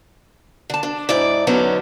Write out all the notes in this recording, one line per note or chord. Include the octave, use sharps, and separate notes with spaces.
D3 A5
D4
G#2 E4 D5
D3 F#3 B3 C#4 D#4 A4